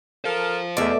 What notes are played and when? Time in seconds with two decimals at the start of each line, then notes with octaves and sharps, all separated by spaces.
0.25 A4 A#4 C5 F5
0.77 E2 B2 A3 D5 E5